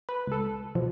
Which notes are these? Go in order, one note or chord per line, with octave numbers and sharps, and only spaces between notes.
B4
C#2 A4
B2 F3